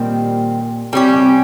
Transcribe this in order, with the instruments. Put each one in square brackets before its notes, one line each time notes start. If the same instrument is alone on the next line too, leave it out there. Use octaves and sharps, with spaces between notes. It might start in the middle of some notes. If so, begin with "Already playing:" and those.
Already playing: [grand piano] A#2 [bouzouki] D#3 G3 C4
[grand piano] C3 [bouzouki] G3 C#4 G4
[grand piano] C3